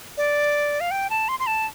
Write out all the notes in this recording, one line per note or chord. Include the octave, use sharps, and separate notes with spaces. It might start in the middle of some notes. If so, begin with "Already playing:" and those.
D5
F5
G5
A5
C6
C6
A5